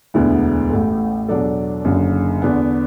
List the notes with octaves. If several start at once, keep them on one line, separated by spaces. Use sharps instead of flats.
E1 D2 D3 B3 E4
A1 A2 A3
E2 B2 F#3 D4 A4
F#1 F#2 D3
E2 D3 B3